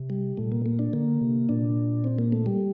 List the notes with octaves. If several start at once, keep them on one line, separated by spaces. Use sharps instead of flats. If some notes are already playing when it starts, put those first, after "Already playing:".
Already playing: C3
G3
A#2 A3
A#3
A#3
D4
D3 A#3
C3
A#2 D4
C4
A#3
A3
G3